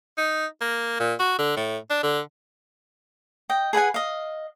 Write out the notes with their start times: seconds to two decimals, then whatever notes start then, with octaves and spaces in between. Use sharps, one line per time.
0.18 D#4
0.61 A#3
1.00 A#2
1.19 F#4
1.38 D3
1.56 A2
1.90 D4
2.03 D3
3.50 D#5 G5
3.73 G#4 B4 F#5 G#5
3.94 D#5 F5